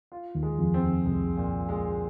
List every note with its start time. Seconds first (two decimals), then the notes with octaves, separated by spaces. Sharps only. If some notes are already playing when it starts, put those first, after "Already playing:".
0.12 F4
0.35 D#2 D#3
0.43 G#3
0.52 D#3
0.58 F2 F3
0.74 C4
0.81 D#2 D#3
1.05 C2 C3 G#3
1.37 A#2
1.69 G#3